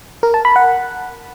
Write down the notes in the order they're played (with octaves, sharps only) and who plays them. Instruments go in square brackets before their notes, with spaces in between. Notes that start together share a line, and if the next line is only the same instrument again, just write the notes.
[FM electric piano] A#4
A5
B5
F#5